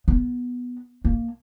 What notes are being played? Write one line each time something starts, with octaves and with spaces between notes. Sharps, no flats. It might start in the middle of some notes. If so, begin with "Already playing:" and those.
B3
A#3